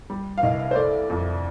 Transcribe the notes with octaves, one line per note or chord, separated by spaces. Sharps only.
G3
F5
C2 D#5
C5
A3 D5
F2